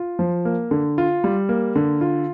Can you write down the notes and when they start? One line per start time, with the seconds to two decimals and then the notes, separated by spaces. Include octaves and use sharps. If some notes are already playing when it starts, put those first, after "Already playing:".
Already playing: F4
0.19 F3
0.45 A#3
0.71 D3
0.98 F4
1.24 G3
1.49 A#3
1.76 D3
2.01 F4